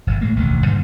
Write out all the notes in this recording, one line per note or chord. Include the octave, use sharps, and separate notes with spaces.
D1 G1
A2 G#3 A#3
E1 A1 D2 D#3
G2 D3 G3 A#3